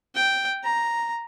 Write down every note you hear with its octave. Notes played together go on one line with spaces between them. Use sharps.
G5
A#5